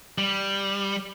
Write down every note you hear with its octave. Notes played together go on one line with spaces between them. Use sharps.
G3